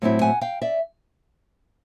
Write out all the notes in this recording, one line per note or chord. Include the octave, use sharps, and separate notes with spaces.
A2 F#3 A3 C4 E4
F#5 G#5
F5 G5
D5 E5